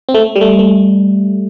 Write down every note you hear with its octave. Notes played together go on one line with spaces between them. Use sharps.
C4
A3
G3
A3
A3